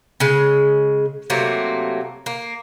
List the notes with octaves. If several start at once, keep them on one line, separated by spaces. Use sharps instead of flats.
C#3 G#3
C3 F#3 A3 A#3
A#3